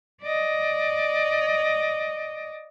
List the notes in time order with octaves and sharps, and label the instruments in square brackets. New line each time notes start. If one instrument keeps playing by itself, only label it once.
[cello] D5 D#5